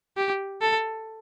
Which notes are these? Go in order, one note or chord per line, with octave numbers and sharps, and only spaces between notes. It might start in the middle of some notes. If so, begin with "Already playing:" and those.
G4
A4